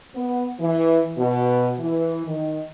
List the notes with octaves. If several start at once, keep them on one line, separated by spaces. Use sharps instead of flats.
B3
E3
B2
E3
D#3